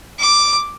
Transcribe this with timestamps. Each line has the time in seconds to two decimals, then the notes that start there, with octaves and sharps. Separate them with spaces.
0.18 D6